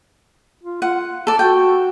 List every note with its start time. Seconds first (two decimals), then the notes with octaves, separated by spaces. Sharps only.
0.63 F4
0.82 F4 F#5
1.27 A4 D5
1.39 F#4 G5